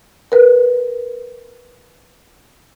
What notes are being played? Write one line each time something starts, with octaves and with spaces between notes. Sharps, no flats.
A#4 B4